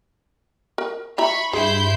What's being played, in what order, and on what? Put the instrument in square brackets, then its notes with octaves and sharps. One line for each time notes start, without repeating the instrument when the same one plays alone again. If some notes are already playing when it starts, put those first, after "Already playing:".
[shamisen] A#4
[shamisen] E4 E5 A#5 [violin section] B5 C#6
[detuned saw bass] G2 [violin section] E4 C6 G6 [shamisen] G#4